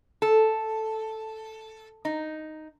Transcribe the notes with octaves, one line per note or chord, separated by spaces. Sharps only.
A4
D#4